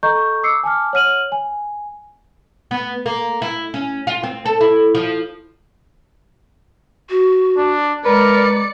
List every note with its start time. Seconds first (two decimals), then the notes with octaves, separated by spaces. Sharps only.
0.03 A4 D#5 A#5 C#6 G6
0.43 D6 E6 C7 C#7
0.63 G#5 A5 D6 F6
0.93 C#5 F#5 F6 D#7 F#7
1.32 G#5
2.71 B3
3.06 A#3
3.42 E4
3.74 C#4
4.07 F4
4.23 C4
4.45 A4
4.61 E4
4.95 F3
7.10 F#4
7.57 D4
8.06 G#3 A#4 B4 D5 C#7